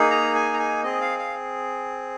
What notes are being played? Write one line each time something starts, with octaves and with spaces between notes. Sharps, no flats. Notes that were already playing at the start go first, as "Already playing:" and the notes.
Already playing: A#3 D#4 G#4
A#5
G#5
A#5
G#5
C4 G#4 D#5
F5
F5